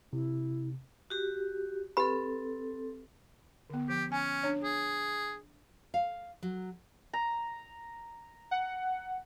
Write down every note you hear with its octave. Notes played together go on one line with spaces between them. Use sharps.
C3 E4
F#4 G4
C4 G4 A4 B4 B5
D3 B3
F3 G4
C#4 G#5
D4 C#5
G#4
F5
F#3
A#5
F#5